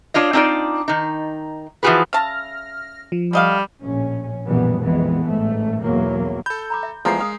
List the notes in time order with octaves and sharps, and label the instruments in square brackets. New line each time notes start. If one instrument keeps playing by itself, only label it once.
[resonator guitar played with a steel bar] D4 F4 C#5 D#5
C4 D4 D#4 F4 D5
D#3 D#4
E3 F3 F4 F#4 G#4 B4
[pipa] C#3 E5 A5 [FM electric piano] F6 A#6
[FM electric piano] F3
[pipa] D3 D#5 F5 [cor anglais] G3
[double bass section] A#1 A2 C#4
A#1 F#2 B2 E3 G3 B3
A#1 F2 E3 G#3 B3
A1 G#2 A3
B1 E2 F#3 A#3
[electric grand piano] A4 G6 [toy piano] B5
[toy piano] A#5 B5 D6
E5
[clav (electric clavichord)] E2 F3 A3 [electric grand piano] G#3 C7 [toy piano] A#4 A#5
[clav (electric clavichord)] F5 [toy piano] D#6